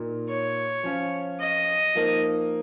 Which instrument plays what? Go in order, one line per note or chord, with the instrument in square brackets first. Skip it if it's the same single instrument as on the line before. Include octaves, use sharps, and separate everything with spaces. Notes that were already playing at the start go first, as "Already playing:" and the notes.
Already playing: [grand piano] A#2 A#3 D#4
[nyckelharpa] C#5
[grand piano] F3 C#4 F4
[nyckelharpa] D#5
[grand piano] F3 A#3 D#4